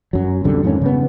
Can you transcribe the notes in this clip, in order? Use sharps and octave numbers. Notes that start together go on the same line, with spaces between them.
F#2 F#3
B1 F2 D3 G3
F2 G#2 D#3 C#4
C#3 B3